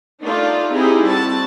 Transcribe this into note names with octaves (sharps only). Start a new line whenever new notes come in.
A3 D4 D#4 F4 G4
C4 D#4 E4 G4 G#4
G3 C4 F#4 A5